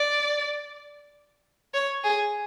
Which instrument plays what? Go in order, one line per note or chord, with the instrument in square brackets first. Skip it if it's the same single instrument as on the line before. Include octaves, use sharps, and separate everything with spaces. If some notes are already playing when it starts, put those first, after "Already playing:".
Already playing: [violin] D5
C#5
G#4